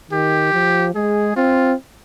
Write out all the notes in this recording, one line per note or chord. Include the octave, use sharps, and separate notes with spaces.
D#3 G4
F3
G#3 G#4
C4 F4